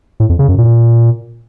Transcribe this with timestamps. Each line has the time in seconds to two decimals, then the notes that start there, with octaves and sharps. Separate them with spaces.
0.20 A2
0.29 F2
0.39 C#3
0.49 F#2
0.58 A#2